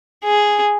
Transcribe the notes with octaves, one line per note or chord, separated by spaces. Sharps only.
G#4